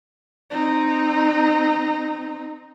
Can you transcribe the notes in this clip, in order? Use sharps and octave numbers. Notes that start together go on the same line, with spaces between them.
C4 D#4